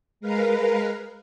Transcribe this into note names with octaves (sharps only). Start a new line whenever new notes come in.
G#3 A#4 B4 F5